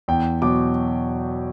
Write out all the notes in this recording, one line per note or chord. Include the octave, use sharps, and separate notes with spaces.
E2 G5
B2 F#3 D6